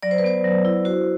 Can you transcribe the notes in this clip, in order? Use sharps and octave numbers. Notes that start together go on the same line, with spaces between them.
F#3 D5
C5
B4
B3 C5
F#3
E4
F#4 C5